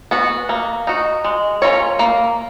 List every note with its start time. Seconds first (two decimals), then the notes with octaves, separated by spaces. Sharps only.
0.11 B3 F#4
0.49 A#3
0.87 D#4 F#4
1.24 G#3
1.62 C#4 F4 A#4 C#5
1.99 A#3